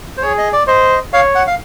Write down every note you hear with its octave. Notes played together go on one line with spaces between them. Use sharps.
C5
G#4 C#5
D#5
D5
C5 D#5
C#5 F5
F#5
F5